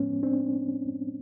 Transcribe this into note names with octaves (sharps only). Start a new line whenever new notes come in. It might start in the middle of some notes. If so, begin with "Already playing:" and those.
Already playing: A2 F3 G#3 B3 C#4
C4 D4